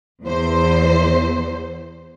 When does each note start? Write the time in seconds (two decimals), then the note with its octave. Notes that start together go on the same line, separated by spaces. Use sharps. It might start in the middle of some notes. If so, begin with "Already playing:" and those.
0.23 E2 C5